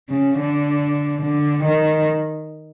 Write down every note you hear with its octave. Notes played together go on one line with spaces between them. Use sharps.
C#3
D3
D3
D#3